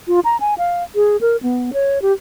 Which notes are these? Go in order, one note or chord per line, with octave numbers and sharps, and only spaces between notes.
F4
A#5
G#5
F5
G#4
A#4
B3
C#5
G4